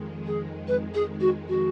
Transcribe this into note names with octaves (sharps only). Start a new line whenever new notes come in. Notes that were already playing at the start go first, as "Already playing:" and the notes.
Already playing: F2 D#3 G#3
G#4
B4
G#4
F#4
F#4